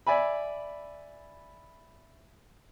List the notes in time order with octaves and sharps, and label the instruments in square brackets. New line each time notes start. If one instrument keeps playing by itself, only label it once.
[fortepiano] D5 E5 G#5 B5